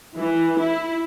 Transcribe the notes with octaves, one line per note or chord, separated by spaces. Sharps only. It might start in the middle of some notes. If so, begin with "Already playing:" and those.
E3
E4